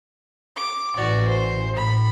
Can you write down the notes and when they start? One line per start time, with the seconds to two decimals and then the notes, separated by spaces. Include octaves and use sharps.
0.56 D6
0.96 A1 E3 F#4 D5
1.28 C5
1.76 A2 B5